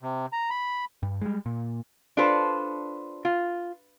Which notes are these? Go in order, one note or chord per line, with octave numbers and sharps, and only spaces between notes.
C3
A#5
B5
G2
G3 G#3
A#2
D4 F4 A4 B4 C5
F4